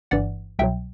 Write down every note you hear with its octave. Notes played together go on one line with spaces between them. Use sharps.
G1 G2 E3 D5 F#5
C2 B2 F#3 E5 G5